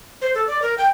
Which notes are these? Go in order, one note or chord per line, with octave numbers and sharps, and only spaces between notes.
C5
A4
D5
A#4
G5